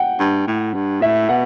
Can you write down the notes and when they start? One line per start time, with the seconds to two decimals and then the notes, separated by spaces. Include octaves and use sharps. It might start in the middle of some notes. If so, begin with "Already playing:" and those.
Already playing: F#5 G5
0.19 G2
0.48 A2
0.74 G2
1.02 A2 E5
1.29 B2 F#5